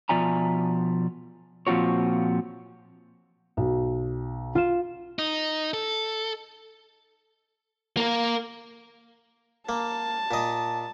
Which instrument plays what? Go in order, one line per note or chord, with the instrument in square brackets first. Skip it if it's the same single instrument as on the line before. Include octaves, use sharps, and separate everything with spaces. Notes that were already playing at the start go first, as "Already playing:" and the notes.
[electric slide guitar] B2 F3 D5 E5 G#5 A#5
A#2 F3 C4 F4 F#4 C#5
[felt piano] B1
[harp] F4 E7
[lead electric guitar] D#4
A4
A#3 A#4
[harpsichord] A#3 [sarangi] A5
[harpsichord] A#2 D#5